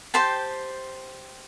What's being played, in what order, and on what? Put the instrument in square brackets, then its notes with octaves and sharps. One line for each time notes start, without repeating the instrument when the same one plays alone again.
[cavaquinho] G4 C5 G5 A5